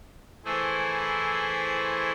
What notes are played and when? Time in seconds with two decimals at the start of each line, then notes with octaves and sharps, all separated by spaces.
0.45 E3 A3 E4 G#4 C5